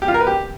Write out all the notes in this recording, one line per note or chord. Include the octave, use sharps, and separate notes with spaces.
G4
F4
A#4
B4
G4